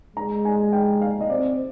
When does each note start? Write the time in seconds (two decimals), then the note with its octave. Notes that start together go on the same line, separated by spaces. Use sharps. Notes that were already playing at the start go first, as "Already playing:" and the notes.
0.16 G#3 A#5
0.45 G#5
0.73 G5
1.01 F5
1.21 D#5
1.29 C4 D5